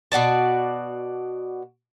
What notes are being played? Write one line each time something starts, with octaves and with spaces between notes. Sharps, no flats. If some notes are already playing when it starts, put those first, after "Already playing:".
B2 F#4 D5 A5